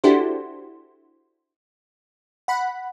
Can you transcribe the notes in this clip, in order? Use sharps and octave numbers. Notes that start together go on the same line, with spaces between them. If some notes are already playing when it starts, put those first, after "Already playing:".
D4 E4 F#4 G4 A4 C5
F#5 B5